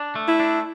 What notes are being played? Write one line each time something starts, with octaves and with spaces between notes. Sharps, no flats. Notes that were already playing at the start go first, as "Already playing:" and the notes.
Already playing: D4
A3
E4
D4